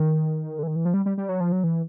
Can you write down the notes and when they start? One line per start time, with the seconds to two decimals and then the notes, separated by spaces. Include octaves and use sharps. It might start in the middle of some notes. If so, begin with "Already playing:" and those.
Already playing: D#3
0.59 D3
0.63 E3
0.67 D#3
0.76 E3
0.85 F3
0.94 G3
1.06 G3
1.17 G3
1.29 F#3
1.40 F3
1.52 F#3
1.64 E3